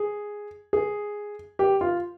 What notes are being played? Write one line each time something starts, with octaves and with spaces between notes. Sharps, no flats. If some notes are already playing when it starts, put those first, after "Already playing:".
Already playing: G#4
G#4
G4
F4